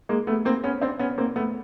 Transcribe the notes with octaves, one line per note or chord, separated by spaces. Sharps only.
G#3 A#3
A3 B3
A#3 C4
B3 C#4
C4 D4
B3 C#4
A#3 C4
A3 B3